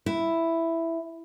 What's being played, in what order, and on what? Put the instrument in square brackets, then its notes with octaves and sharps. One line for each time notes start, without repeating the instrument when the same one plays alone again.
[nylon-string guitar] E4